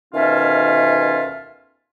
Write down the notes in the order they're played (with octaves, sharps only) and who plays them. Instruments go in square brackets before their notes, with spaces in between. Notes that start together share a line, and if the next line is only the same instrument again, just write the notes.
[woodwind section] D2 B2 D#3 C#4 F4 E5